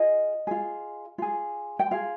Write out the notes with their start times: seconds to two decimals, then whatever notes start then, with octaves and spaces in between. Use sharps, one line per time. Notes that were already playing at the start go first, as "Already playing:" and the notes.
Already playing: F4 G#4 D#5
0.47 F4 G#4
1.18 F4 G#4
1.79 G5
1.91 F4 G#4 F5